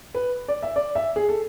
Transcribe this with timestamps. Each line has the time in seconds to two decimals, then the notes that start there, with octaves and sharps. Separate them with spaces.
0.15 B4
0.48 D5
0.63 E5
0.76 D5
0.95 E5
1.16 G#4
1.29 A4